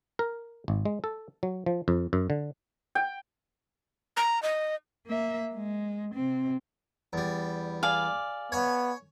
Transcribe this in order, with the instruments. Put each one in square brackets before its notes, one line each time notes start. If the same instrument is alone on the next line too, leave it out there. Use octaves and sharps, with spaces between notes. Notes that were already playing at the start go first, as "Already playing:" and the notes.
[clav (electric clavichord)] A#4
G#1
G#3
A4
F#3
F3
F2
F#2
D3
[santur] G5
[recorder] A#5
D#5
[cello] A#3 E5
G#3
C3 C4
[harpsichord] E2 G3
[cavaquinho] G#4 D5 F5
[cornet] B3 [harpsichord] C#5 G#5